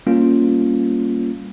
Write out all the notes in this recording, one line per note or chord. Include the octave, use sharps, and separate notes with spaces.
G3 A#3 C#4 F4